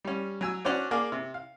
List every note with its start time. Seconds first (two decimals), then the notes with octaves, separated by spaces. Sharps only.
0.04 G3 C#4
0.41 F#3 G#5 E6
0.65 C#4 D4 F#4 C5 D5
0.91 A#3 G#4 D5 F5
1.12 C3
1.34 F5